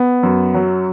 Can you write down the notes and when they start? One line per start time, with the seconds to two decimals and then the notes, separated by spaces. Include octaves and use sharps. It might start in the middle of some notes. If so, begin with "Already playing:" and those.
Already playing: B3
0.23 F#2
0.54 F#3